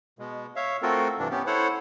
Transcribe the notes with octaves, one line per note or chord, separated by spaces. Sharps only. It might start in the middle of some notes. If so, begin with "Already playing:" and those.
B2 G#3
C#5 E5 F5
A3 C4 F4 F#4 A4 A#4
G2 C3 E3 D4
B3 C#4 G4
E4 A4 C5 C#5 F#5